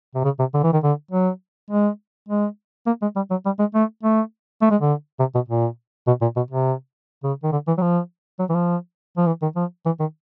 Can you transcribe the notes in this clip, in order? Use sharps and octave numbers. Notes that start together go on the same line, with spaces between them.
C3
C#3
C3
D3
E3
D#3
D3
F#3
G#3
G#3
A#3
G#3
G3
F#3
G3
G#3
A3
A3
A3
G#3
D3
C3
B2
A#2
B2
A#2
B2
C3
C#3
D#3
D3
E3
F#3
F3
F#3
E3
F3
F3
E3
D#3
F3
E3
D#3